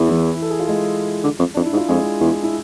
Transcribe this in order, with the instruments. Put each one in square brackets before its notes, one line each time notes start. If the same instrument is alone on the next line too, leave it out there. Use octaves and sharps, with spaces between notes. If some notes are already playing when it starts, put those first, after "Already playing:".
Already playing: [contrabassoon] E2
[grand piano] E3 E4
A4
G#4
F4
G#3 G#4
[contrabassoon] D3
F2
[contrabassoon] F2 [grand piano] D4
[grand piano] E4
[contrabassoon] G#2
[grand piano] F4
[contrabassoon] F2 [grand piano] G#3 G#4
[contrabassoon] E2
[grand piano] E4